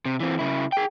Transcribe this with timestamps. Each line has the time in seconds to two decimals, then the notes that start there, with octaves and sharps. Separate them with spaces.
0.05 C3
0.20 E3 C4
0.39 C#3 E4
0.72 G#4 G5